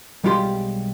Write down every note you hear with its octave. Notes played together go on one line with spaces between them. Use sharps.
B1 G3 G#3 F4 G4 C6